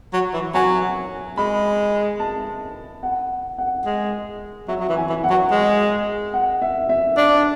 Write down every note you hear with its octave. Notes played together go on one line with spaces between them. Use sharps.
F#3
E3
F#3 G#5
G#3 B5
A5
F#5
F#5
G#3
F#3 E5
F#3
E3
G#5
E3
F#5
F#3
G#3
F#5
E5
E5
D4 D5